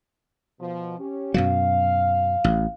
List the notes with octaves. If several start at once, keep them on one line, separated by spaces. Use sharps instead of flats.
B2 F3
C#4 G4
F#2 B2 F#3 F5
A1